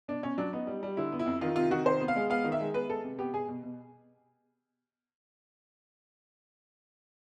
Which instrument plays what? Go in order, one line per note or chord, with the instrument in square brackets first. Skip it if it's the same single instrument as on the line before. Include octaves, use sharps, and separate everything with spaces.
[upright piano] B2 D4
B2 C#4
F#3 D4
B3 D#4
G3
G3
D3 E4
B3
E4
F2
D#3 F4
C3 F4
D#3 F#4
C3 C5
B3
F5
G#3
B3 F5
D#3
E5
G#3
B3 B4
G#3 A4
C3
B3 G4
B2 G#4
B2
B2